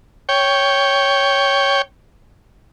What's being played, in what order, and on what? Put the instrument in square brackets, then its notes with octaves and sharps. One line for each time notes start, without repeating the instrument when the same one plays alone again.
[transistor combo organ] C#5 G5